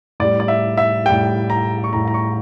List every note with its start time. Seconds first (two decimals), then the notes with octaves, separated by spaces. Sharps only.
0.20 A2 G3 D5
0.40 D5
0.48 E5
0.77 E5
1.06 A2 G3 G5
1.50 A#5
1.84 C#6
1.92 A2 G3 A#5
2.08 A#5
2.14 C#6